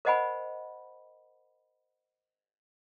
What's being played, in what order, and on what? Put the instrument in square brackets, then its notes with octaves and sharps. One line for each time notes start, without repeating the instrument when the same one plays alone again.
[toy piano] A#4 C5 D#5 F#5 G#5 B5